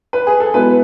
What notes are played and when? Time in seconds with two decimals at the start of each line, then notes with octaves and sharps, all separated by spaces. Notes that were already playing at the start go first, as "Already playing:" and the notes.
0.13 B4
0.27 G#4
0.40 A4
0.54 B2 G#3 B3 E4 B4